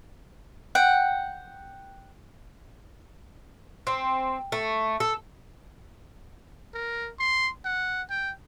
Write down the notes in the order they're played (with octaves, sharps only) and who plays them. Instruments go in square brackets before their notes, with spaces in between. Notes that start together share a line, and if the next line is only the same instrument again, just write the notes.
[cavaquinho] F#5 G5
[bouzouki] C4
A3
A4
[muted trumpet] A#4
C6
F#5
G5